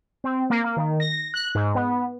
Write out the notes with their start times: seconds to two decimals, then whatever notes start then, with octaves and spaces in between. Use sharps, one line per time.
0.24 C4
0.50 A#3
0.64 A#3
0.77 D#3
1.00 A#6
1.34 F#6
1.55 G#2
1.75 B3